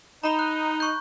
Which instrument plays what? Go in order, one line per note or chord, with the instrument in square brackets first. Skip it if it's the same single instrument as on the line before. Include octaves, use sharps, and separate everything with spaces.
[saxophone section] D#4 [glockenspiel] A#5 B5 G7
[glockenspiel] F#6
C#6 G6